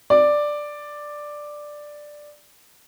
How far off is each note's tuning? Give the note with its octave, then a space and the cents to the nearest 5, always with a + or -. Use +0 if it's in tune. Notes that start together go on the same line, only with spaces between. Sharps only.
D5 +5